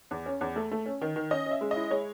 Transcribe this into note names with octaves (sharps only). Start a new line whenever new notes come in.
E2
C#4
E2
A3
A3
C#4
D#3
D#3
C#4 D#5
C#4
E5
G#3
D#5
E4
G#3 C#5